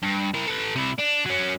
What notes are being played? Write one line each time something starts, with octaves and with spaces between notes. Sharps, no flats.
G2
E4 A#4
A4 B4
C3 E4
D4
F#3 C#4